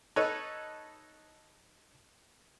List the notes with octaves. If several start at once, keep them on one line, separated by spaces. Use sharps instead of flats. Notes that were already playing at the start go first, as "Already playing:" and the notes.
D#4 A4 B4 C#5